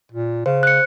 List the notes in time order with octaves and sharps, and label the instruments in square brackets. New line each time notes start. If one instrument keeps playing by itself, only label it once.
[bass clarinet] A#2
[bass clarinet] C#3 [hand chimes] C5
[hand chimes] F#6 C#7